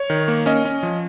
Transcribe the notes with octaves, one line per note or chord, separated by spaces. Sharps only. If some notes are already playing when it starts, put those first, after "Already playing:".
Already playing: C#5
D#3
A#3
C#4 D#5
C#4
F3